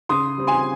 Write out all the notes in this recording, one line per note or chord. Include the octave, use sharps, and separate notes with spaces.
C#3 C6 D#6
G3 C4
G#5 C6